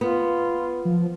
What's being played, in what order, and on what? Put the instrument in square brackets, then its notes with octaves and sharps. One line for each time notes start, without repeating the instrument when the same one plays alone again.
[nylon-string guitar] B3 [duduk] F4
[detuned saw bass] F3